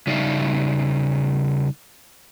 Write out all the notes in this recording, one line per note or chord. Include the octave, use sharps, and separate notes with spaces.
C#3 G3 D#4 D5 E5 F5